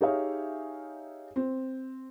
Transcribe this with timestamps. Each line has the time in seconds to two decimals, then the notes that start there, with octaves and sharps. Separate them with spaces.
0.01 D#4 G4 G#4 C#5 E5 F5
1.36 C4